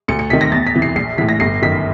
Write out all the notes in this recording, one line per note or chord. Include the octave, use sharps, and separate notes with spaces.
D2 C#7
C#7
C3 D#3 B6
A#6
E2 A6
B6
C3 E3
C7
A#1 C7
A2 E3 B6
A#6
G1 C7
F#2 D#3 B6